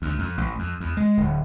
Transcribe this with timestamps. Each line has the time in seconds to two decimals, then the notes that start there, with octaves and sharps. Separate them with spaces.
0.02 D2
0.19 F2
0.38 A1
0.59 F2
0.80 E2
0.97 G#3
1.17 D1